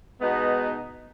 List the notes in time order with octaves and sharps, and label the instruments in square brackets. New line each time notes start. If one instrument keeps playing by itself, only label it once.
[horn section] B2 G#3 B3 D#4